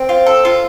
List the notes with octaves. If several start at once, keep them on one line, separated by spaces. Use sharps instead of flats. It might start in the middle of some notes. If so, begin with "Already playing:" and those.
Already playing: C4
F4
A4
F4